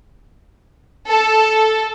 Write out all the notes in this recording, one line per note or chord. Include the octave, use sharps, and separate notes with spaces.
A4